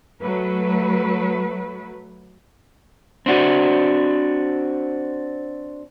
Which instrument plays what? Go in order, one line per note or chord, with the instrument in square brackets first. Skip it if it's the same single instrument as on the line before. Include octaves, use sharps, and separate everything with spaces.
[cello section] F#3 A3 B4
[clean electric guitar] C4 D4 F#4